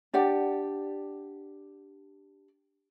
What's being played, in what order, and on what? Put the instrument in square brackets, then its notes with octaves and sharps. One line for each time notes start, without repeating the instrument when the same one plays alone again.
[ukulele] D4 G4 D5 F#5